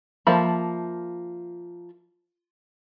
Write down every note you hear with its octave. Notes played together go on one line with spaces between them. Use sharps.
F3 A#3 E5 A5 B5